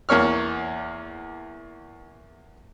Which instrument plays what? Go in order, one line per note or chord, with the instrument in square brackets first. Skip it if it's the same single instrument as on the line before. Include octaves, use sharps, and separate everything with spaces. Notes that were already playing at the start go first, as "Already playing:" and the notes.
[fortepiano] E2 A#3 C#5 F6